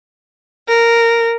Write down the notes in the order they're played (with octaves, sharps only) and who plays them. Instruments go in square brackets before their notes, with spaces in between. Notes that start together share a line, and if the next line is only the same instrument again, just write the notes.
[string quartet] A#4